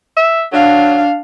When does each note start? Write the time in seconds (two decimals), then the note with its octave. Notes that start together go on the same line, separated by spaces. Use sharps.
0.17 E5
0.52 F#3 D4 F5